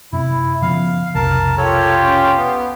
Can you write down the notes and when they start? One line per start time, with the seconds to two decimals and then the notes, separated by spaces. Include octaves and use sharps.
0.13 F#2 C3 E4
0.62 C#3 F3 B3 F5
1.15 B1 F2 C3 A#4 A5
1.58 F4 G4 A4 C#5
2.02 C#4
2.37 B3